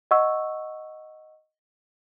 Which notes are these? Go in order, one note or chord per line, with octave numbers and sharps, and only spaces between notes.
D#5 F#5 C#6 E6